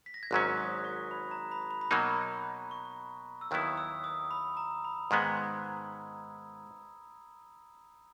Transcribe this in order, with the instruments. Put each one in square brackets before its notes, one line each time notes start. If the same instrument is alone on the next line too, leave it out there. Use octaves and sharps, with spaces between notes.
[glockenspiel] B6
A#6
G#6
[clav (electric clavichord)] G#1 G#2 F#3 C#4 [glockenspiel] F#6
[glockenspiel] D#6
C#6
B5
A#5
B5
B5
B5
[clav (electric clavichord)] B2 F#3 A#3 D#4 [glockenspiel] A#5
[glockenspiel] C#6
E6
[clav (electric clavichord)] D#2 D#3 F#3 B3 E4 [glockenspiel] D#6
[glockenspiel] E6
D#6
B5
A#5
B5
[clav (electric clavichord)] G#2 D#3 G#3 B3 [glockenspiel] G#6
[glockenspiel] G#6